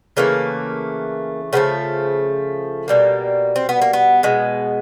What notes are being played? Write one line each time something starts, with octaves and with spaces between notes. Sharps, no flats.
C#3 E3 A3 A#3
C#3 F3 A3 B3
B2 G3 A#3
C4
B3
A#3
B3
B2 G#3